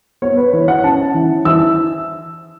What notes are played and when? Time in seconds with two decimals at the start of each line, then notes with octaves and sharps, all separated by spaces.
0.22 B3 C#5
0.37 B4
0.53 E3 C#5
0.68 F#5
0.84 C#4 A5
1.14 E3
1.45 E3 E6